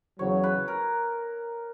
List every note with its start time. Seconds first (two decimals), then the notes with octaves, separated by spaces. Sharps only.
0.19 E2 C#3 F#3 C#5
0.43 B4
0.68 A#4